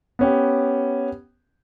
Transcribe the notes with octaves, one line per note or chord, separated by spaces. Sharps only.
B3 C#4 G4